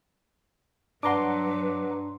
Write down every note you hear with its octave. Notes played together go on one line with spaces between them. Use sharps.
G2 F#3 D4 B4 F#5 A#5 C6 D6